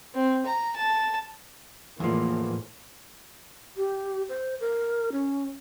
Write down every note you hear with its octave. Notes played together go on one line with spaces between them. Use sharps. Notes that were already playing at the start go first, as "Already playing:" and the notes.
C4
A#5
A5
E2 A2 E3 F3 A#3
G4
C5
A#4
C#4